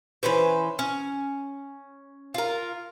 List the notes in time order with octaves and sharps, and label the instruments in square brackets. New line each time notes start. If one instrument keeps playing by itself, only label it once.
[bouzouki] E3 C#4 B4 C5
C#4
F4 A#4